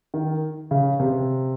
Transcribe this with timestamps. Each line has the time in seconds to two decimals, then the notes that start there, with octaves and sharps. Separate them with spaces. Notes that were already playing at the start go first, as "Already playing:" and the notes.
0.14 D#3
0.71 C#3
1.00 C3